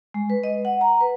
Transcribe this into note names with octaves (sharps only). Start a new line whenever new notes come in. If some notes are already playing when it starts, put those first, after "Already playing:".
G#3
B4
D#5
F#5
A#5
B4